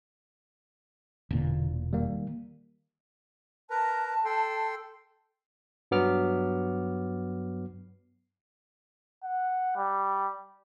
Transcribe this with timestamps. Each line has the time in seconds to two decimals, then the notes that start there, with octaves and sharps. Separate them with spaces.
1.31 E1 A#2 D3
1.93 D#3 G3 A#3
3.70 A#4 B4 A5 A#5
4.25 A4 G5 C6
5.91 G2 F#3 B3 D6 F6
9.24 F#5
9.77 G3